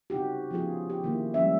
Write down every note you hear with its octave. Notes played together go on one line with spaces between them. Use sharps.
C#3 C4 D#4 F#4 G4
F3 B3 C#4 F4 G#4
G4
D#3 A#3 E4
F3 G3 G#3 C#4 E5